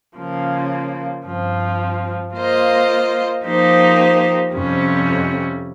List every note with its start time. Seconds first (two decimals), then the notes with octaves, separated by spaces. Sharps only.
0.16 C#3 F3 A#3
1.26 G2 F3 C4
2.35 A#3 F4 C5 D#5
3.45 F3 A#3 D#4 G4 C5
4.54 F2 C3 G3 C#4